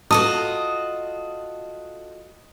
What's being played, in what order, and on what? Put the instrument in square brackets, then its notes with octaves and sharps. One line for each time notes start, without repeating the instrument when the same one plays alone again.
[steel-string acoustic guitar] F4 F#4 D#5 [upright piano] A4 A5 D#6